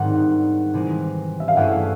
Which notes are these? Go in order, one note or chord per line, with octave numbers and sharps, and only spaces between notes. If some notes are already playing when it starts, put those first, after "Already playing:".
Already playing: G#2 D#3 G3 C4 D#4 F#5
C3 E3 G#3
E5
F5
G2 E3 A3 C#4 E4 F#5